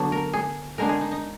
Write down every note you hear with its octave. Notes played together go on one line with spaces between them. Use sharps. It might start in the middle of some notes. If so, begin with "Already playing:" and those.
Already playing: D3 F#3 B3 D4
A#4
G#4
D3 G#3 B3 D4 A#4
G#4
D#4
D#4